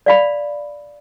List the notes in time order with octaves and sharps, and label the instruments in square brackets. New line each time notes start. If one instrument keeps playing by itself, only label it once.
[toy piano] D5 F5 B5